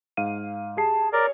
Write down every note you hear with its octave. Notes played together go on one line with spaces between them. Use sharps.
G#2 F5 D#7
G4 G#4 A5 C7
A#4 C#5 D5